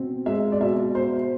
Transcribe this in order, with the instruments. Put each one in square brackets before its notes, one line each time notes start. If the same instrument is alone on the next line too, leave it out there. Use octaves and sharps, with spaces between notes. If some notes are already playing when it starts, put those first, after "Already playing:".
Already playing: [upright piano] B2 C4
G#3 E5
D5
B2 E5
B2 C5